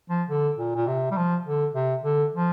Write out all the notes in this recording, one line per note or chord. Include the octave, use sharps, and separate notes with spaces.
F3
D3
A#2
A#2
C3
G3
F3
D3
C3
D3
F3